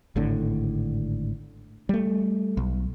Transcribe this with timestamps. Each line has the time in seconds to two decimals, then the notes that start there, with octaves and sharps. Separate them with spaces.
0.16 G#1 A2 D3
1.89 G3 A3
2.57 B1